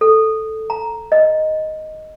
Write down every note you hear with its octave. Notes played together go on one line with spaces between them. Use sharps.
A4
A#5
D#5